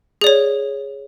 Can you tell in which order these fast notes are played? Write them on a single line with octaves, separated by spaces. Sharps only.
G#4 D5 C#5